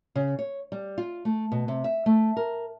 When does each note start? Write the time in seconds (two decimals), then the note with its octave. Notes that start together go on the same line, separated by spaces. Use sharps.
0.15 C#3
0.39 C#5
0.72 G3
0.98 F4
1.25 A3
1.52 B2
1.68 C3
1.84 E5
2.06 A3
2.37 A#4